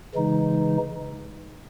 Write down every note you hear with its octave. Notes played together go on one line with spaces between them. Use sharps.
C#3 E3 G#3 D#4